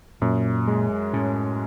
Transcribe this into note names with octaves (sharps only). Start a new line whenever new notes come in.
F#2 A#2
G#3
A2 C#4